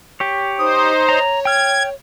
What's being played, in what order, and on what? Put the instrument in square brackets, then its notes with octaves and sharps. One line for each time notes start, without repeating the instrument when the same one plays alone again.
[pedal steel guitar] G4 C#5
[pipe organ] D#4 C5 [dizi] D#6
[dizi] C#5 [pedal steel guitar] A#5
[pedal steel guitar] G5 F6 [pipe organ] G#6